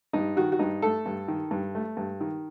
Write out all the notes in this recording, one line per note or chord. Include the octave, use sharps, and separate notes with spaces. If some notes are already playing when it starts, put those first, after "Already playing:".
G2 D#4
D#3 F#4
F#4
G2 D#4
A3 A4
G2
D#3
G2
A3
G2
D#3